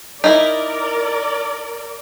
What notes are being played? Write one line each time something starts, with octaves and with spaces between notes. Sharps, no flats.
D#4 E4 A#4 D5